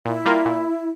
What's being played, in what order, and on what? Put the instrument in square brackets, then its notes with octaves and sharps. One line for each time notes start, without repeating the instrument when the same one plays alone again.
[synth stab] A#2 [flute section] E4
[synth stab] G3 A#3 F4 A#4
A#2